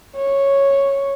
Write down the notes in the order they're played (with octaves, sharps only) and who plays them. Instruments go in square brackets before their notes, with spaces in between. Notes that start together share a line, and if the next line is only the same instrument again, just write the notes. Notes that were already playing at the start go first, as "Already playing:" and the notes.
[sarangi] C#5